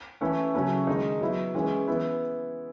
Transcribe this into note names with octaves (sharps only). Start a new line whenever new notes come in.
E3 A3 C#4 E4
C#3 F#3 A3 C#4 E4
D#3 G#3 D#4
F#3 B3 E4
E3 G#3 C#4 E4
E3 B3 E4